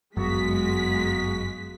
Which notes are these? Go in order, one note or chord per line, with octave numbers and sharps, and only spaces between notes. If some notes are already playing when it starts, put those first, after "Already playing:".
G1 F#2 F#3 G#3 A#3 B3 F#4 B6